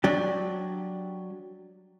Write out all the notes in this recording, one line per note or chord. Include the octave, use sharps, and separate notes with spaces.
F#3 D4 G4